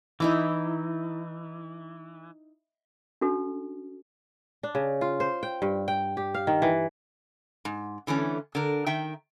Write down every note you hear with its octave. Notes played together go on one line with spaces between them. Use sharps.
E3 D#4 E4 D6
C#4 D4 F#4 A4
D4
C#3
F4
C5
G5
G2
G5
G4
F5
D#3
E3
G#2
D3 E3 A3 C#4
D3 A#4
D#3 E5 G5